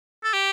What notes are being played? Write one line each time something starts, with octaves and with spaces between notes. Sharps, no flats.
A4
G4